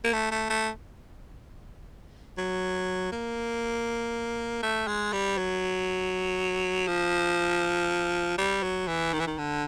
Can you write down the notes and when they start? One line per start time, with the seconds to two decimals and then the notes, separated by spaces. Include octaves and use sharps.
0.04 A#3
0.13 A3
0.31 A3
0.50 A3
2.38 F#3
3.12 A#3
4.63 A3
4.87 G#3
5.13 G3
5.38 F#3
6.87 F3
8.38 G3
8.63 F#3
8.87 E3
9.13 D#3
9.20 E3
9.27 D#3
9.38 D3